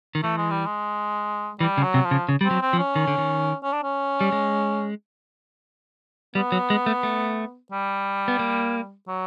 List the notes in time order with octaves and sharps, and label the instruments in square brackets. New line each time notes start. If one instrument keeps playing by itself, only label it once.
[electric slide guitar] D#3
[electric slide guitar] E3 [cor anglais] A3
[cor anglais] G#3
G3
G#3
[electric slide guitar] E3 [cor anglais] G3
[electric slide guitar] C#3
[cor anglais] F#3
[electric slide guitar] C3
[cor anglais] F3
[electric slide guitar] C#3
C#3
[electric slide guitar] G3 [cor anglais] C4
[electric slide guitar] F#3
[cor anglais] C4
[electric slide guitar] F3
[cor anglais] C#4
[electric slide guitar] D#3
D3
D#3
[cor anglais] C#4
D4
C#4
[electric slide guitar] G3
G#3
[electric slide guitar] G3 [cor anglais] B3
[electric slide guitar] F#3
G#3
A3
A3
[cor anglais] G3
[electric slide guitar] B3
A#3
[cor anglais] F#3